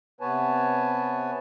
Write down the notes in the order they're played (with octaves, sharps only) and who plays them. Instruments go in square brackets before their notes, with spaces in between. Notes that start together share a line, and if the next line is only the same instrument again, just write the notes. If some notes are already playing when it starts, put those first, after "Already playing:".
[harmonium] C3 B3 B4 C#5 G#5 A5